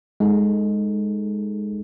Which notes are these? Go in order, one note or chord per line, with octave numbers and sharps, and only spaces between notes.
G#3 D#4 A4